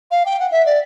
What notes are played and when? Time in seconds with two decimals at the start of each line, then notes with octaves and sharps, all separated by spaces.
0.11 F5
0.25 G5
0.39 F#5
0.51 E5
0.66 D5